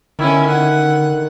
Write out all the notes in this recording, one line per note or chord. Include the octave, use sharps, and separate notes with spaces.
D3 D#3 C#4 E4
F#5